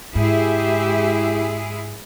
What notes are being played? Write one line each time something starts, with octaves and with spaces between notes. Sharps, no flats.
G#2 G#3 E4 G4 G#4 E5